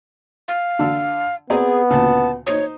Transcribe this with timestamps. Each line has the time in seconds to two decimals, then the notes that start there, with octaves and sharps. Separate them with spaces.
0.48 F5
0.79 D3 D4 E6
1.50 B3 C4 G#4 D5 A#5
1.91 D2 A#2 C#3 A5
2.47 D#4 C5 C#5 D#6